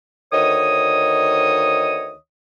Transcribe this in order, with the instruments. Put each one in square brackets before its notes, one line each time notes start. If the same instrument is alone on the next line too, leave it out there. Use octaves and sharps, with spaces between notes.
[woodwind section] D2 D#3 C#5 D#5 D#6